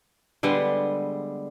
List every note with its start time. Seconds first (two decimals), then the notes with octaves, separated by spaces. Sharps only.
0.43 D3 G3 G#3 B3